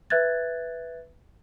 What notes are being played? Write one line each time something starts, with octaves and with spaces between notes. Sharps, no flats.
B4 E5 F#6 G#6 A6